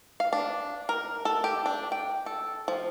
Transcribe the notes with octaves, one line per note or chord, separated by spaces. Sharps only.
F5
D4
A#4
A4
G4
D4
G5
A4
F3